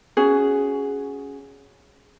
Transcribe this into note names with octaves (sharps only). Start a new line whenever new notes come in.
C#4 F#4 G#4